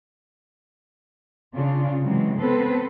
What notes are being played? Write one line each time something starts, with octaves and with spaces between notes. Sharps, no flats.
C#3 D4 F4
C3 E3 F#3 G#3
B3 C4 A4 B4 C5